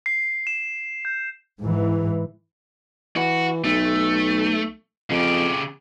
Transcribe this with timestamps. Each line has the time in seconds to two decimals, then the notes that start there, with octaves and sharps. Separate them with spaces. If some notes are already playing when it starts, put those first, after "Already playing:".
0.06 C7
0.47 E7
1.05 G6
1.60 G#2 E3
3.16 E3 F#4
3.64 B1 A3
5.10 F2 C#3 G4